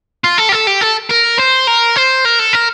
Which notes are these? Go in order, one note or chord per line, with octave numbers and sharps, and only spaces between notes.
F4
A4
G4
A4
G4
A4
A#4
C5
A#4
C5
A#4
A4
A#4